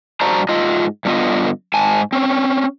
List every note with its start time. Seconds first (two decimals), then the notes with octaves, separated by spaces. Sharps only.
0.21 G2 F#4 C5 D5 A5 A#5
0.49 G#2 F4 D#5
1.05 G2 D3 B3 F4 D#5
1.74 G#2 G#5 A5
2.13 C4 C#4